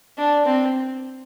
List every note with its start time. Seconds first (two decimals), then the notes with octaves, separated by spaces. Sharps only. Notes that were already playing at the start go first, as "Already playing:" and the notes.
0.18 D4
0.45 C4